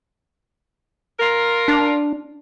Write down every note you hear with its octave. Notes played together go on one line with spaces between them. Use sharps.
F4 A#4
D4